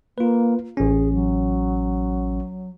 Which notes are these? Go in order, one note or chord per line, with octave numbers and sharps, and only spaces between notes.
A#3 F4 B4
A1 C#4 G#4
F#3